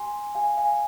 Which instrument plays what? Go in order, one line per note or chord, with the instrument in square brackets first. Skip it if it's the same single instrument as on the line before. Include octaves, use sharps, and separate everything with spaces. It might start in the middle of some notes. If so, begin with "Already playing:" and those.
Already playing: [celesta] G4 G#5 C6
G4 F5 G#5
F5 G#5